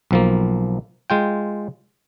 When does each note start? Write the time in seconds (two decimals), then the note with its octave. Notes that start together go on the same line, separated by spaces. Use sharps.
0.11 B1 F3 A#3
1.10 G#3 F4 G5